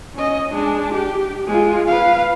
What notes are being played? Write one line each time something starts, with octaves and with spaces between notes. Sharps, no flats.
C#4 D#5
G#3 D4
G4
G#3 F4
B4 F5